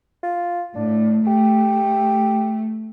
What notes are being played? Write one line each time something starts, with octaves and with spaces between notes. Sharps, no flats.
F4
A2 D4
A3 G4